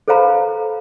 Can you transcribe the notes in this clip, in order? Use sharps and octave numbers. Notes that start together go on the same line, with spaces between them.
A4 B4 C5 F5 A#5 B5